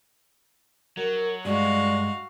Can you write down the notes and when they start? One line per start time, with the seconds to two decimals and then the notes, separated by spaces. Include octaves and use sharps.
0.97 F#3 A#4
1.45 G2 G#3 F#4 D5 F5